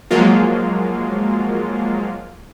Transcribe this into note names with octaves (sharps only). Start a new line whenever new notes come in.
F3 F#3 G#3 A#3 F4